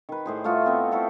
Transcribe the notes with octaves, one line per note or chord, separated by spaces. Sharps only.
D#3 B4
A2 G#4 C5
A3 F4 F#4 D#5
B3 C4 D#5
E4 F#4 A4 C5